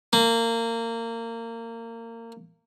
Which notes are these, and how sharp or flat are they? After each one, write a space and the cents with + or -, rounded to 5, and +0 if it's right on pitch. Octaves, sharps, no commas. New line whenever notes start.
A#3 -25